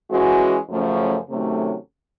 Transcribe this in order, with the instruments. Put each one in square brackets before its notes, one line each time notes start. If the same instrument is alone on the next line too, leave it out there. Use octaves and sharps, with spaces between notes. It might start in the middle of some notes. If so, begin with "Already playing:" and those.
[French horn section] E3 G#3 C#4 F#4
F#2 C#3 F3 A3 C#4
C3 D#3 F#3 A3 C#4